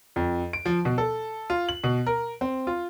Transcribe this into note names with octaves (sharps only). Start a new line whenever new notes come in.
F2
D7
F3
B2
A4
F4
F#7
B2
A#4
C4
F4